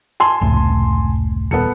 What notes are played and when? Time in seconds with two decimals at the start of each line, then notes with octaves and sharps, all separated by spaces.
0.20 G#5 A5 C6
0.41 F1 C#2 A2
1.51 D#1 B3 A4 C#7